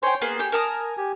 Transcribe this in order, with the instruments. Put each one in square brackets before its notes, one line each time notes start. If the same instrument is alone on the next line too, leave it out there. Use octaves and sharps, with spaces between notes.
[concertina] C5 G#5 C6 [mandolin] C#5 G5
[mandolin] A#3 B3 G#4 [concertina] G#5
[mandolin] G4 A4 G5 [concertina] G#5
[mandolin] A#4 A5 D#6
[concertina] G4 G#5